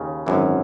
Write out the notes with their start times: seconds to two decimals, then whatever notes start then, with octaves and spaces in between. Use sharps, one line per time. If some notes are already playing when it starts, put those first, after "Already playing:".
Already playing: D#2 C#3
0.26 G#1 F#2 E3